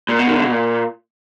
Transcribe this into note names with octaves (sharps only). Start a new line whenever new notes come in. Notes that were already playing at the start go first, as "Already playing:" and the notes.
A#2
B2
D#3
D3
B2
A#2